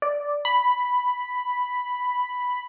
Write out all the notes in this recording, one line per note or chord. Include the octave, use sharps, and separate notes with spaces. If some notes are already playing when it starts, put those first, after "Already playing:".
D5
B5